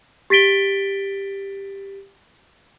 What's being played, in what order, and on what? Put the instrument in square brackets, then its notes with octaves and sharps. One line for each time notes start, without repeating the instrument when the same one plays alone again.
[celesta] G4 A6 B6 D7 G7